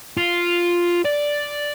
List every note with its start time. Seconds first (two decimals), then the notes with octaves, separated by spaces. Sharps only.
0.17 F4
1.05 D5